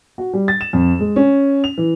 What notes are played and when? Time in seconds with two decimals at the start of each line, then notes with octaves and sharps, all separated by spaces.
0.18 F#4
0.33 G3
0.48 A6
0.61 E7
0.73 F2
0.99 G#3
1.16 C#4
1.64 F7
1.78 E3